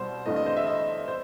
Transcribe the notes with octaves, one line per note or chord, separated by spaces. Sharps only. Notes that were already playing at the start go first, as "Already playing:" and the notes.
Already playing: C2 B2 G3 C5
G1 G2 E3 A3 D#5
D#5
C5
E5
D#5
C5